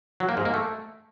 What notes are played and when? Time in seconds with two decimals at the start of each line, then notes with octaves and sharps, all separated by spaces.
0.20 F#3
0.29 A#3
0.37 G#2
0.45 A#3
0.54 A3